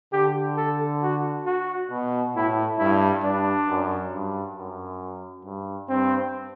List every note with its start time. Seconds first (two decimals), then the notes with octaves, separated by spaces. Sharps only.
0.13 D3 G4
0.57 A4
1.03 F#4
1.46 F#4
1.91 B2
2.35 A2 E4
2.79 G2 E4
3.23 G2 D4
3.68 F#2
4.12 G2
4.57 F#2
5.45 G2
5.89 G2 C4